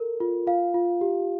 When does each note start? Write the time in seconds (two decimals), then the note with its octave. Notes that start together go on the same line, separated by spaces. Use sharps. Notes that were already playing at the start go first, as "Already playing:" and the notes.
Already playing: A4 A#4
0.20 F4
0.47 F4 F5
0.74 F4
1.01 G4